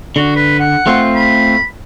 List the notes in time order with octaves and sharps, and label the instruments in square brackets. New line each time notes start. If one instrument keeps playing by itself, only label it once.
[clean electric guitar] D3 [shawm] F#4
[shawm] B4
F#5
[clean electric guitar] A3 C4 F4
[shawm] B5